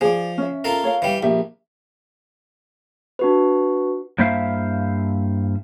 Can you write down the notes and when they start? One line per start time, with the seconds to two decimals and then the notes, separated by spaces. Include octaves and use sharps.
0.01 F3 G#4 D5
0.38 C#4 E5
0.64 F4 A4 A#4
0.84 C#5 F5
1.02 E3 G3
1.23 A#1 G4 E5
3.19 D4 F#4 B4
4.18 G2 A#3 E4 C5 E5 F5